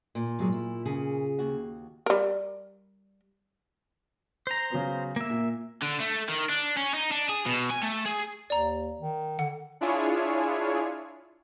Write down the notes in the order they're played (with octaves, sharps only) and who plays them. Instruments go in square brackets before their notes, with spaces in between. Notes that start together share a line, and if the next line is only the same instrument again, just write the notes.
[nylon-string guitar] A#2
[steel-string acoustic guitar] C3 F#3 G#3
E4
C#3 G#4
[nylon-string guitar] D#2 F#4
[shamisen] G3 A#4
[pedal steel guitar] C5 A#5
[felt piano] C#3 F#3 B3
[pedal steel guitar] A#3 E5
[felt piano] A#2
[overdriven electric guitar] D3
A3
D#3
D4
C#4
D#4
D4
G#4
B2
G#5
A3
G#4
[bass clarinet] D#2 [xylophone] D5 A#5
[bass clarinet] D#3
[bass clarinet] D3 [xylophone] F#5
[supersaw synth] D4 E4 F4 G#4 C#5